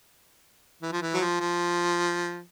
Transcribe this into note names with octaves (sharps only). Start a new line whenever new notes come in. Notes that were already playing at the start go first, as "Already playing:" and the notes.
E3
F3
E3
F#3
F3
F3